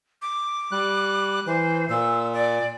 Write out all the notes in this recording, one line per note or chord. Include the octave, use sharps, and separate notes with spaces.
D6
G3 F#6
E3 C5
A#2 E6
D5